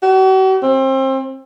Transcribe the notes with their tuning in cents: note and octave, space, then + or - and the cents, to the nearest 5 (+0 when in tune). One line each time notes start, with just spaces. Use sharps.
F#4 +45
C4 +30